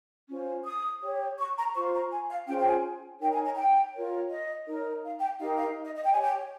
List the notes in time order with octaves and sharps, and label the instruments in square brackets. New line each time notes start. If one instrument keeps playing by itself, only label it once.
[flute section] C#4 F4 C5
D#6
G4 C#5
C#6
A#5
F4 C5 C#6
A#5
G#5
F5
C#4 F4 G#4 C5 G5
G5
G#5
D#4 A#4 C#5 G5
G#5
A#5
G5
F4 A#4 C#5
D#5
D#4 A#4 C#5
F5
G5
D#4 G4 A#4 F5
F5
D#5
D#5
G5
G4 C#5 G#5
G5